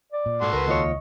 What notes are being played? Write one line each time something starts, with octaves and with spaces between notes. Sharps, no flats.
D5
A#2
G#2 F#4 A4 C6
C#2 A#4 B4
D#2 F4 C#5 D#5